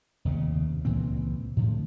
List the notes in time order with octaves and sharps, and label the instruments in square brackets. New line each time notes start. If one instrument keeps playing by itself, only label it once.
[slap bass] F1 D#2 C#3
C#2 A#2 E3 C4
A2 D3 F3